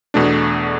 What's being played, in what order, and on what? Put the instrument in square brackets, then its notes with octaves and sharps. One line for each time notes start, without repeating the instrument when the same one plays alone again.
[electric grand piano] E2 B2 A3 D4